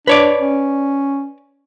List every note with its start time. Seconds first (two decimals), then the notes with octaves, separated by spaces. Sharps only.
0.07 D4 B4 C#5 D5
0.40 C#4